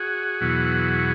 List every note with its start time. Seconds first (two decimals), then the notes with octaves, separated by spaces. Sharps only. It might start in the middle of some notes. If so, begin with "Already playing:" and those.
Already playing: F#4 G#4
0.41 E2 B2 F#3